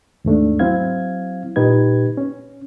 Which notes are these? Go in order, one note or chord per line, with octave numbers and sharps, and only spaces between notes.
D#2 G#2 A3 D4
F#3 C4 E4 F5 G#6
A#2 D#4 G4 B4 G#6
C#4